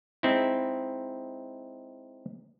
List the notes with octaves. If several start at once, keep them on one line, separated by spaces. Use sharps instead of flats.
G#3 C4 D#4 E4